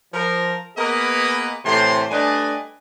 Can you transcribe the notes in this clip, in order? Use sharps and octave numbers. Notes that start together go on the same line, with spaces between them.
F3 A#4
A#3 B3 G#4 A#4 B4 D#5
A2 C3 E3 A3 C5 C6
G3 A3 D4 B4 D#5 G#5